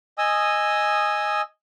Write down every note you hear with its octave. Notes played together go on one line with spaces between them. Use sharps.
D#5 G#5 D#6 E6